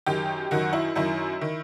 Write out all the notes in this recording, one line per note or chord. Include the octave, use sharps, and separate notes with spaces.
F#2 D#3 G4
F#2 D#3 F#4
E4
F#2 D#3 E4
D#3